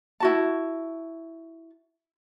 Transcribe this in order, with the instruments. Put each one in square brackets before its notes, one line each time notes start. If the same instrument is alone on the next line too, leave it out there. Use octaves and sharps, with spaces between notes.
[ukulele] E4 F#4 A5